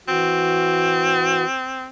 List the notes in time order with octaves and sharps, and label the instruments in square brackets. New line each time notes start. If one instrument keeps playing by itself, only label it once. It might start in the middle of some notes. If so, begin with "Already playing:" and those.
[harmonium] E3 F#4 [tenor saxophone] C4